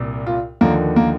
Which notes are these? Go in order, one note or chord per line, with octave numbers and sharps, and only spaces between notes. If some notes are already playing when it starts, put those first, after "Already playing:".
Already playing: C2 A#2
F4
D#2 D3 F3 A#3
A#3